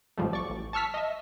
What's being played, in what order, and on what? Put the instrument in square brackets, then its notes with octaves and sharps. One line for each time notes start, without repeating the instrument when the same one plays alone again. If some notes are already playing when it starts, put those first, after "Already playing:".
[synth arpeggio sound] A1 G#2 F3 G3 A3
B1 D5 C#6
A1
A5 C#6 E6 F6 B6
D#5 E5